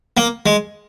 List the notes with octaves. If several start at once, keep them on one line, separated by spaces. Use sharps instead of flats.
A#3
G#3